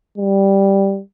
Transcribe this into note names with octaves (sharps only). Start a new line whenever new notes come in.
G3